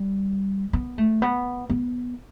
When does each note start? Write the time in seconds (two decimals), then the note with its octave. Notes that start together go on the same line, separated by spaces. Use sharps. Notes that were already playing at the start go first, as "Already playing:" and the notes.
Already playing: G3
0.73 B3
0.98 A3
1.22 B3
1.70 B3